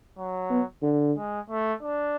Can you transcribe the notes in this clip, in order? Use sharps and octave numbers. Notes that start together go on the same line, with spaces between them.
F#3
B3
D3
G#3
A3
D4